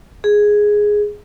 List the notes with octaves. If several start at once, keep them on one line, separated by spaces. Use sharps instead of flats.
G#4